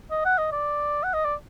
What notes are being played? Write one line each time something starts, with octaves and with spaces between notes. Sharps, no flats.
D#5
F#5
D#5
D5
F#5
D#5
D5